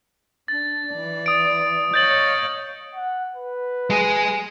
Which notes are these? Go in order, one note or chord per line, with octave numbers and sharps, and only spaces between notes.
D4 A6
E3 D5
D#6 D7
C#5 D#5 F5 G6 A6 F#7
F#5
B4
G#3 G#4